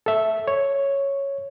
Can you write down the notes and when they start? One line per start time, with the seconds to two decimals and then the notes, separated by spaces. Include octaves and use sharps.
0.06 A4 E5
0.48 C#5